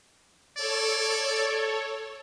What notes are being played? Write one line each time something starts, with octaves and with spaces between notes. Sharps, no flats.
A4 C#5 D5